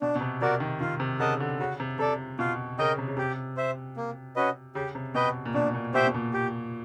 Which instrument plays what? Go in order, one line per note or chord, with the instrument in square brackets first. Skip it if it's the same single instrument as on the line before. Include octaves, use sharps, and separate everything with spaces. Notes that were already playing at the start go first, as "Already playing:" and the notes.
[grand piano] B2 [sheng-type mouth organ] D4
[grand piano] B2
C3
[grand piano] C3 [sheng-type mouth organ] F#4 A#4 D5
[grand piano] D#3
[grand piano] D#3 [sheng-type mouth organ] F4
[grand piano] C3
[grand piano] C#3 [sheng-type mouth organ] A#4 D#5 F#5 A5
[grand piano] D3
[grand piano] C#3 [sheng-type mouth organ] F#4
[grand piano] C3
[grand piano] C3 [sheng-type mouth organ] A4 D5
[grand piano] B2 [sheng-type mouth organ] F4
[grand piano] C#3 [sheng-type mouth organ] A#4 D#5 G5
[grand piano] C3
C#3
[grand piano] C3 [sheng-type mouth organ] G4
[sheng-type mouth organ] C5 E5
A#3
C#4 F#4 B4 D#5
[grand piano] C#3 [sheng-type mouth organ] G4
[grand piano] C3
[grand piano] B2 [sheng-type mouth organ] B4 D#5 G5
[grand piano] A#2
[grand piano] B2 [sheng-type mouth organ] D4
[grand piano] A#2
[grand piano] B2 [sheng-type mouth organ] G4 C5 E5 G5
[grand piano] B2
A#2
[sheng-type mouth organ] G4